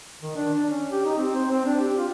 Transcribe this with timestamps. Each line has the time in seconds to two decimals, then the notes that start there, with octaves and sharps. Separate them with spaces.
0.22 D#3
0.36 D4
0.55 D4
0.70 C#4
0.91 G4
1.05 D#4
1.18 C4
1.35 C5
1.50 C4
1.66 D4
1.80 G4
1.98 F4